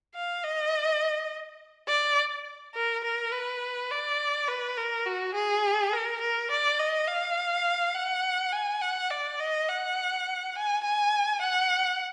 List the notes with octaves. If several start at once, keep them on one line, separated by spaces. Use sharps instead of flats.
F5
D#5
D5
A#4
A#4
B4
D5
B4
A#4
F#4
G#4
A#4
A#4
D5
D#5
F5
F#5
G#5
F#5
D5
D#5
F#5
G#5
G#5
F#5